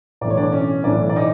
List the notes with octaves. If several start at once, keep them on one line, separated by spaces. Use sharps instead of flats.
B1 A2 E3 D5
C#5
D4 D5
C#4 C#5
B1 A2 E3 D4 D5
D5
D#4 D#5